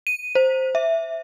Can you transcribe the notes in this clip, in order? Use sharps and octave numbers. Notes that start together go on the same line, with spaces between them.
D#7
C5
E5